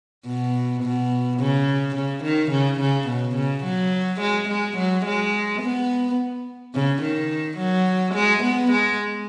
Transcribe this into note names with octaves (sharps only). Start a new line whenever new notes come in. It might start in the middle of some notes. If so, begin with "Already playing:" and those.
B2
B2
C#3
C#3
D#3
C#3
C#3
B2
C#3
F#3
G#3
G#3
F#3
G#3
B3
C#3
D#3
F#3
G#3
B3
G#3